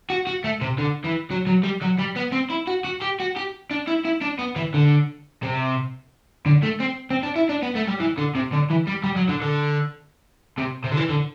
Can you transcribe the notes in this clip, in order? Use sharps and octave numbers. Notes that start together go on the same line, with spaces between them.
F#4
F#4
A3
C3
D3
E3
F#3
F#3
G3
F#3
G3
B3
C4
E4
F#4
F#4
G4
F#4
G4
D4
E4
E4
D4
B3
E3
D3
C3
D3
A3
C4
C4
D4
E4
D4
B3
A3
G3
E3
D3
C3
D3
E3
G3
G3
F#3
D3
D3
C3
C3
D3
E3
D3